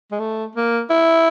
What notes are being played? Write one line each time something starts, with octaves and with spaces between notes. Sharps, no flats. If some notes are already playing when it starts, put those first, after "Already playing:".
G#3
A3
A#3
E4